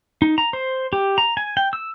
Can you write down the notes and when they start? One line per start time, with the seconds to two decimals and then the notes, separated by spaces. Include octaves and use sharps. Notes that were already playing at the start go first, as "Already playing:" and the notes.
0.22 D#4
0.38 A#5
0.53 C5
0.93 G4
1.18 A#5
1.37 G#5
1.57 G5
1.73 E6